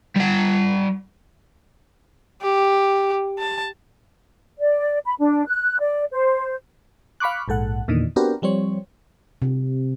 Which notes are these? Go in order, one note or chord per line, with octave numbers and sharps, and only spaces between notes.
G3 F#5
G4
A5
D5
B5
D4
F#6
D5
C5
F5 B5 C#6 D6 F#6
A#1 G#2 A4 F#5
E2 A#2 D3 D#3
B3 C4 D4 F#4 G4 A#4
F3 G3 C4 C#5
C3